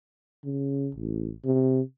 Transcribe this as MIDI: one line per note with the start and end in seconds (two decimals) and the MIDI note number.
0.44 0.90 49
0.95 1.33 33
1.45 1.81 48